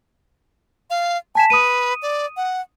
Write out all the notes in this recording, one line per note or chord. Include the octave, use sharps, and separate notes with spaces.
F5
G#5 A5 B6 E7
B4 D#6 D#7
D5
F#5